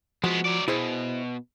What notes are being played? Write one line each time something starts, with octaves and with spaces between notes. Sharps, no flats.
F3 G#3 B3 F#4
F#3 D5
B2 E4 G#4 C5